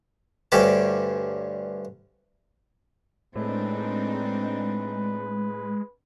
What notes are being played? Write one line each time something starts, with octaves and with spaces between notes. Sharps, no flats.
D2 G2 C#4 G4 D5 A5
A2 G#3 C4 D4 D#4 B4